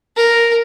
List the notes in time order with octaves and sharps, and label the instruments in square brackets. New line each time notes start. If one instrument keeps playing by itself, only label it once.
[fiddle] A#4